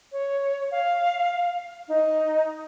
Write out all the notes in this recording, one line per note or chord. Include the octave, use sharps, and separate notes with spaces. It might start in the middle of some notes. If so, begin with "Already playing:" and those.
C#5
F5
D#4